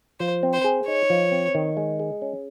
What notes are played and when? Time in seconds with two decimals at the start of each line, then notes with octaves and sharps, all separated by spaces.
0.20 F3 C5
0.43 C4
0.53 C5
0.64 G#4
0.87 D#4 C#5
1.10 F3
1.32 C4
1.55 D#3
1.77 G#3
1.99 G#4
2.22 C#4